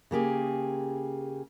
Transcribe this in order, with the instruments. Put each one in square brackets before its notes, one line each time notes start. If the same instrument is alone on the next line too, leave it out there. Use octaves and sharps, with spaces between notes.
[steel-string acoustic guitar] C#3 A#3 G4 G#4